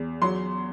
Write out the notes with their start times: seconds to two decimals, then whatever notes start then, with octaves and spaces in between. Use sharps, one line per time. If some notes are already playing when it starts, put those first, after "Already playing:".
Already playing: E2
0.22 F#3 C6